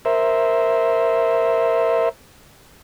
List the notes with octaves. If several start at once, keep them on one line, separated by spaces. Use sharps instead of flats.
A#4 C5 E5